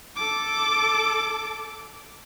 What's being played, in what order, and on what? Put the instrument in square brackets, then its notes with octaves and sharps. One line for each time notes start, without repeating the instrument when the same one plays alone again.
[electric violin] A4 D6